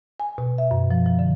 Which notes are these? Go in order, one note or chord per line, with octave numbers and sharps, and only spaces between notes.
G#5
B2
E5
F#2
F3
F3
D3